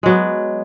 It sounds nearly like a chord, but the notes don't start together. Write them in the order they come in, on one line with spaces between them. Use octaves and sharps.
G#3 F#3 B3